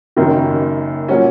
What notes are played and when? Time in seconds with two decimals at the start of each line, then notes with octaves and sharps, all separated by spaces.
0.17 F#1 F#2 D#3
1.09 A#2 F#3 C#4